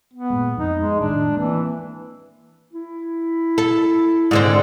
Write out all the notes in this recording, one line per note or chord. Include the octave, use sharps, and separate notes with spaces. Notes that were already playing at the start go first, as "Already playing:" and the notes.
B3
A#2 G#3
F2 D#4
G#3
A2 D#3 G#3 D4
E3 A#3 C4
E4
A4
G#2 D3 C4